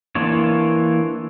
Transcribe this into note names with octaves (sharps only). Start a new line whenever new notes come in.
E3 A#3 D4 F4 C#5